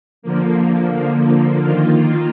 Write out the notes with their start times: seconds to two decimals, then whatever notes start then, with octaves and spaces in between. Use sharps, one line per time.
0.22 D3 F3 A#3
1.64 D#3 A#3 F4